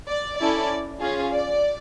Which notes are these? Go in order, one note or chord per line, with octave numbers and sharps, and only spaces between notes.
D5
C#4 E4 A4 D5
C#4 F4 G#4
D5